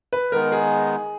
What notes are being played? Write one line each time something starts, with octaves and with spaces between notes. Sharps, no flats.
B4
D#3 G#3 B3 D#4 A#4
G#4